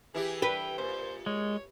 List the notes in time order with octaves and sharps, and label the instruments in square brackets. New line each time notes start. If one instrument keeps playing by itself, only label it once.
[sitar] E3 E4 G4 [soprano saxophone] G#4
[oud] B4 [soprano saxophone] G5
[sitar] A#2 [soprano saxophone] C5
[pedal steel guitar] G#3 [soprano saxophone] C#5